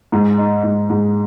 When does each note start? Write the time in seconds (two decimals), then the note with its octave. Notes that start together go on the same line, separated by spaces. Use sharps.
0.12 G#2
0.38 D#4
0.64 G#2
0.90 G#2